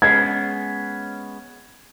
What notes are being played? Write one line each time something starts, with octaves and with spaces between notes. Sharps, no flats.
G#3 B3 C#4 G#6